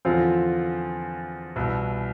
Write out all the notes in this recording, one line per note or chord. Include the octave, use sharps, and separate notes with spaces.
E2 D3 F3 C4 F4
C2 B2 B3 E4